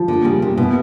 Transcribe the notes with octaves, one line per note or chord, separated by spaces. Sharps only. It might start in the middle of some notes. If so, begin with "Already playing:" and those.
Already playing: F3
D3 A#3
C#3 G3
C3 A#3
B2 E4